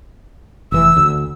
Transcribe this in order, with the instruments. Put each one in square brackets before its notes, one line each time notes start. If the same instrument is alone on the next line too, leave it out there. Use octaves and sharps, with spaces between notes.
[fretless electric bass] F1 E3 [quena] E6
[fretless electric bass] D2